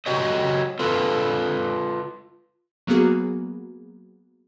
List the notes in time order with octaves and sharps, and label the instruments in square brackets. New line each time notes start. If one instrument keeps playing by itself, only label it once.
[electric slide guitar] F#4 G4 C#5 D#5
F4 A4 B4
[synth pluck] F#3 A#3 B3 F#4 G#4